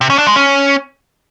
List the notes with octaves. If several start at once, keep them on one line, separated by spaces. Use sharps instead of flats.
C3
C#4
D4
G#3
C#4